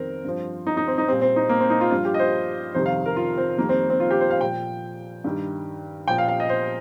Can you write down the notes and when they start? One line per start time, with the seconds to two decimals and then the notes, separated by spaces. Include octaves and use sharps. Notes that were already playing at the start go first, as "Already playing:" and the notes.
Already playing: F2 D#3 G3 C4 A#4
0.24 G2 F3
0.67 D#4
0.77 D#4
0.88 C4
0.98 D#4
1.08 G3 C4
1.12 A#2
1.21 C4
1.36 D#4
1.49 A#3
1.60 C4
1.70 D#4
1.81 F4
1.91 G2 F3 F4
2.05 G4
2.14 D#5
2.19 C5
2.75 F2 C3 D#3 G3 C5
2.86 F5
3.06 A#4
3.17 F4
3.37 C4
3.58 F2 D#3 G3 A#3
3.69 C4
3.90 C4
4.00 F4
4.11 G4
4.21 C5
4.30 F5
4.41 A#2 F3 G5
5.24 G2 D#3 G3
6.08 A#2 F3 G5
6.18 F5
6.28 F5
6.40 D#5
6.49 C5